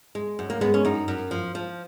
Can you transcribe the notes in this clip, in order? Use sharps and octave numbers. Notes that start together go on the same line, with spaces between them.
G#3
F#2
A#3
G#3 B3
C#4
F#2 D#4
F#2
F3
F3